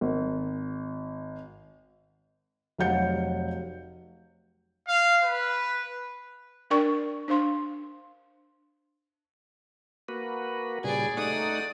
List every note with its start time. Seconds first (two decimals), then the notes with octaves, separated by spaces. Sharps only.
0.01 G#1
2.78 F1 F#3 F5 F#5 G6 C#7
4.88 F5
5.24 B4
6.70 D4 A#4 D5 G5 C#6
7.28 D4 C5 F5 C6
10.08 A#3 F#4 B4
10.84 A#2 C#3 G3 G#4 D5
11.17 A3 D#4 D5 F#5 D#6